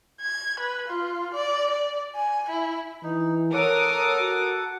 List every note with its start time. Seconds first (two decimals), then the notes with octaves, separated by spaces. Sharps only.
0.21 G#6
0.60 B4
0.88 F4
1.34 D5
1.70 D5
2.16 G#5
2.50 E4
3.03 E3 D#4
3.54 A4 A#4 C#5 F#5 D6 D#6
4.20 F#4